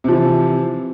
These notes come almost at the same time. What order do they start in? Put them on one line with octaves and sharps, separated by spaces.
C3 F3 E3